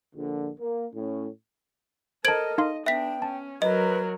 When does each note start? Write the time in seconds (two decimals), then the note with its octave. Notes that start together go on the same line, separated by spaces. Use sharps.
0.15 A#1 D3
0.59 A#3
0.94 A2 C#4
2.25 A4 A#4 C5 D#5 A5 G#6 D7 F#7
2.58 D#4 D#5 F5 C6
2.86 B3 D4 E5 G5 B6
3.22 C#4 A5
3.62 F#3 A#4 B4 D#5